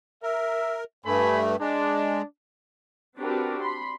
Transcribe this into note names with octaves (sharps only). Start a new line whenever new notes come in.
A#4 E5
G2 A3 G#5 B5
G#3 D4
C4 D4 F#4 G4 A#4 B4
B5 C6